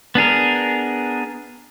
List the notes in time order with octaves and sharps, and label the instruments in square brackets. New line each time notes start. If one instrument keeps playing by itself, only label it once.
[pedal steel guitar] B3 D4 G#4 A#4